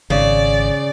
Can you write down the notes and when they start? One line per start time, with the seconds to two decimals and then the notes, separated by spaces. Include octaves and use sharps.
0.10 G#1 C#3 D5